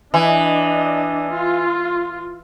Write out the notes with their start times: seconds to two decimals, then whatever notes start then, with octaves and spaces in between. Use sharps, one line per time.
0.14 E3 D4 D#5
1.34 F4